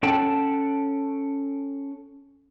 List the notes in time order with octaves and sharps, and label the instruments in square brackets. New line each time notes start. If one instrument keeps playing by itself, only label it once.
[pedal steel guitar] C#4 A4 F#5 G5 A5